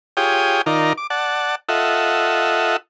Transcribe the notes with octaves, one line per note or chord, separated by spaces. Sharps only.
F4 G4 G#4 C#5 G5 D#6
D#3 D#4 F4 A#4 D5
D6
D5 F#5 A5
F4 A4 D#5 E5 F#5